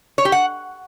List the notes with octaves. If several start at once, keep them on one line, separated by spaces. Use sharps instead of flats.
C#5
G4
F#5